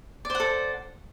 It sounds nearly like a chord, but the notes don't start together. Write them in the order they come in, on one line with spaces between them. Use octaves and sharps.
D5 C5 F#5 A4